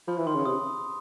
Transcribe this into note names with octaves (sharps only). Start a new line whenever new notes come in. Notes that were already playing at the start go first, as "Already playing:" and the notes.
F3 B5
E3
D#3 C6
C#3
C3 D#6